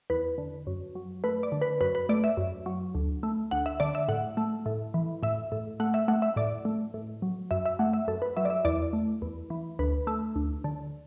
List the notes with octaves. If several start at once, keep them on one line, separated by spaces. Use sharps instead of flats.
E2 B4
D3
F#2
F#3
A3 B4
D5
D3
B4
F#2 B4
B4
A3 D5
E5
F#2
F#3
D2
A3
D2 F#5
E5
D3 D5
E5
A2 F#5
A3
A2
E3
A2 E5
A2
A3 F#5
E5
A3 F#5
E5
A2 D5
A3
A2
F#3
F#2 E5
E5
A3 F#5
E5
F#2 A4
B4
F#3 E5
D5
E5
E2 D5
A3
E2
E3
D2 B4
A3
D2
D3